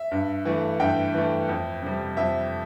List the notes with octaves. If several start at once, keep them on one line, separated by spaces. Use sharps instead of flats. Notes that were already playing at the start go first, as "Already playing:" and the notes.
Already playing: E5
G2
E3 A3
G2 E5 G5
E3 A3
F2
C3 G3
F2 E5